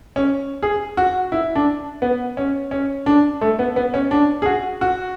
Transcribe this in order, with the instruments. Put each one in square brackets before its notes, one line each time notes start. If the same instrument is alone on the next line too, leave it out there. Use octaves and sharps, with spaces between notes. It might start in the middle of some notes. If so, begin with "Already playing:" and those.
[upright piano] C#4
G#4
F#4
E4
D4
B3
C#4
C#4
D4
A3
B3
B3
C#4
D4
G#4
F#4
F#4